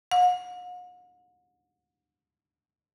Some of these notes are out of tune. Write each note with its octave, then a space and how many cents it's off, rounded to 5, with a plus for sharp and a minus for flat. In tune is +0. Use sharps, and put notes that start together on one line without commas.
F#5 -45